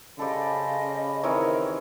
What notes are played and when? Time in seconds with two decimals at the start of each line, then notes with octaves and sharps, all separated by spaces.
0.19 C#3 G4 A4 C5 D5 D#5 B5
1.23 D#3 E3 C4 A4 A#4 C#5